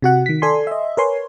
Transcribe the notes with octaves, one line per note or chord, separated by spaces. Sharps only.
C3 F#4 F#5
D#3 B6
A4 D5 G#5 C6
D#5 E5
A#4 B4 C#5 G#5 C6